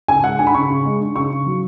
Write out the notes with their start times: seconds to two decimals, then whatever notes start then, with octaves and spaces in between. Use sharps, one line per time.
0.08 C#3 G#5
0.23 G#3 F#5
0.39 D4 G#5
0.47 B5
0.54 C#3 C#6
0.70 C#3
0.85 G#3
1.00 D4
1.16 C#3 C#6
1.31 C#3
1.46 F#3